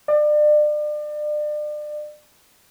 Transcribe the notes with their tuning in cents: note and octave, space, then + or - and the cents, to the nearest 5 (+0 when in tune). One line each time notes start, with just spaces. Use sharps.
D5 +35